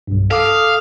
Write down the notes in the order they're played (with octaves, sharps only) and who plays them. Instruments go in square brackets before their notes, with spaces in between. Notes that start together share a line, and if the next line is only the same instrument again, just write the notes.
[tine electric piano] B1 G2
[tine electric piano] A4 D6 D#6 [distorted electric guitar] F5